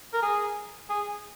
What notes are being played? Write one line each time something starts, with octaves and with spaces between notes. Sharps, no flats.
A#4
G#4
G#4